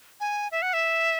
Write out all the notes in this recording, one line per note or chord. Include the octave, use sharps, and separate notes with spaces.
G#5
E5
F#5
E5